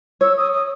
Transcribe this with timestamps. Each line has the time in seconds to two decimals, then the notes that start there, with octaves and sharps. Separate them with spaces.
0.21 C#5 E6
0.37 D#6
0.52 D#6